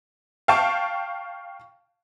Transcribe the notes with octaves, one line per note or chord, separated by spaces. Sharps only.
F5 G5 A5 C#6